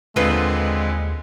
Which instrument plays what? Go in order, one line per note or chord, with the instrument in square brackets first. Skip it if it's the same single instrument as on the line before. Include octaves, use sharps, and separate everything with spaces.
[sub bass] D#2 [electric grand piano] A#2 D3 C4 [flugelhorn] G#3 [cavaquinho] F4 B4 D#5